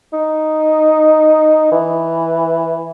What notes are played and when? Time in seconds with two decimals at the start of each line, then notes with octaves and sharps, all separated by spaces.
0.13 D#4
1.72 E3